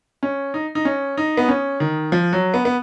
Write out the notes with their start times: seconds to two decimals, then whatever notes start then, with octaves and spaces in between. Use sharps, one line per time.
0.23 C#4
0.54 D#4
0.75 D#4
0.85 C#4
1.17 D#4
1.37 B3
1.49 C#4
1.80 D#3
2.12 F3
2.33 F#3
2.54 B3
2.65 B3